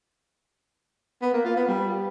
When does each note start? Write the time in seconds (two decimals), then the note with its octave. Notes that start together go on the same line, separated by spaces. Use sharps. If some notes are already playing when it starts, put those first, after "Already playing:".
1.22 B3
1.33 A#3
1.45 F4
1.56 B3
1.68 G3